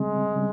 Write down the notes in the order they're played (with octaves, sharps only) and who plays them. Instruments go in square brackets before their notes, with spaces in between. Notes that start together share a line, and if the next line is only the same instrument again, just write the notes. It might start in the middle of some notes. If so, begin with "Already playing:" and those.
Already playing: [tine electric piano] C#3 G3 C4 [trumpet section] G#3
[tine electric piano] C#3 G3